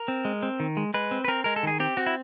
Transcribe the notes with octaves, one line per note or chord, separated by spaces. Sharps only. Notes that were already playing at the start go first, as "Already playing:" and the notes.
Already playing: A#4
C4
G#3
C4
D#3
G#3
G#3 B4
C4
B4
C4 A#4
G#3 A#4
A4
D#3 G#4
C4 G4
C4 F#4
E4